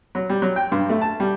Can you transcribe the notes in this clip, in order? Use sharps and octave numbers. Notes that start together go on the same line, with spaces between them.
F#3
G3
F#3
G5
G2
A3
A5
G3